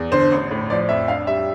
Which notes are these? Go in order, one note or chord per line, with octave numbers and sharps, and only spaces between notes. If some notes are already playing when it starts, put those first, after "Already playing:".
Already playing: E2
D3 C5
A1
A2
F3 D5
F2 E5
D4 F5
G3 E5